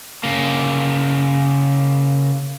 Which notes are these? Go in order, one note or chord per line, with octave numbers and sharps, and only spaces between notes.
C#3 A#3